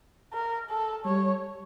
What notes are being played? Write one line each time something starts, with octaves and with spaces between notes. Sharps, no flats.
A#4
A4
G3 C#5